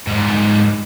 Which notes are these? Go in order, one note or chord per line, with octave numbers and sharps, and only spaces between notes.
G#2 G3